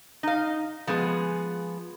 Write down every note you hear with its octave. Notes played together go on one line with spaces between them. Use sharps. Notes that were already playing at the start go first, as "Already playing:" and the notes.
D#4 F5
F3 G#3 B3 G#4